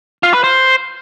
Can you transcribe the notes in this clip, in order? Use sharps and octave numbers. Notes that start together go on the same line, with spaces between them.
F4
B4
C5